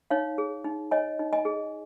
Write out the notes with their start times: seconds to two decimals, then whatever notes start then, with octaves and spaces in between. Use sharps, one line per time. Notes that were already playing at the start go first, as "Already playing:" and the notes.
0.10 D#4 C#5 F5
0.38 G#4
0.64 D#4
0.91 C#5 D#5 G#5
1.19 D#4
1.33 D#5 G#5
1.45 G#4